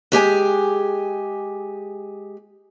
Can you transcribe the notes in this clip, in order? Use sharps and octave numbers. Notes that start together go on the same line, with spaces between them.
G#3 G4 G#4 G#5